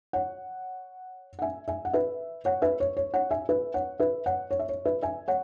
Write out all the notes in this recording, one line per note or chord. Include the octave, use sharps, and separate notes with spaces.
C#5 F#5
F#5
E5 G#5
E5 G#5
F#5
B4 E5
C#5 F#5
B4 E5
C#5
C#5
C#5 F#5
E5 G#5
B4 E5
C#5 F#5
B4 E5
C#5 F#5
C#5
E5
C#5
B4 E5
E5 G#5
C#5 F#5